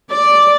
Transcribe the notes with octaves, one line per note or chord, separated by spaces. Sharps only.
D5